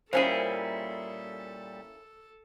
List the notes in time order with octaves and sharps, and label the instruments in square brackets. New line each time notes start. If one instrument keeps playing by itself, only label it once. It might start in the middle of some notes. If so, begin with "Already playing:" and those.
[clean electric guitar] A#2 G3 G#4 [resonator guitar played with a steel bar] A#3 C#4 E4 [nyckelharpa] A4 [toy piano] C5